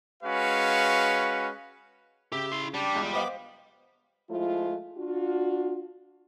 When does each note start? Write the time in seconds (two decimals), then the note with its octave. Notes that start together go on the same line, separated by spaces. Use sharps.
0.23 G#3 C#4 F#4 B4 F5
2.32 C#3 G4 E5
2.52 E4 C6
2.74 G3 D4 G4
2.95 E2 G#3 F4
3.13 B3 C5 D#5 F5 B5 D6
4.29 F3 G#3 A3 E4 F4
4.97 D4 F4 F#4